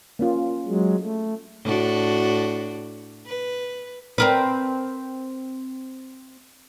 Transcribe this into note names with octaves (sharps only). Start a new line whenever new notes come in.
A#3 C#4 F4
F#3 G#3
A3
A2 D4 F#4
B4
C4 A#4 B4